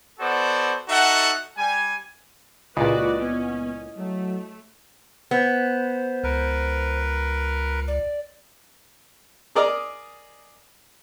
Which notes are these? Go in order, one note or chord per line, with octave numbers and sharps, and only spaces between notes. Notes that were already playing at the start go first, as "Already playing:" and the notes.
B3 F#4 A4 C5 D5
D#4 F#4 A4 E5 F#5
G3 G#5
C#2 A#2 E4 F#4 B4 D5 D#5 D#6
B3 C#4
F#3 A3
B3 C5
C#2 A#4 B4
D5
G#4 A#4 D5 D#5 A#5